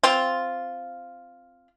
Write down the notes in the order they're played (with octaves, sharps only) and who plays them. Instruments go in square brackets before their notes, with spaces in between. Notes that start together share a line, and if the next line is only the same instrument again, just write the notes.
[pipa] C4 F4